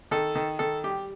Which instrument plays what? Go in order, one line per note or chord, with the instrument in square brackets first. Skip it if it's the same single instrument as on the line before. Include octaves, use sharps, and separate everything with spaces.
[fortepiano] D#3 A4
D#3
D#3 A4
G3 G4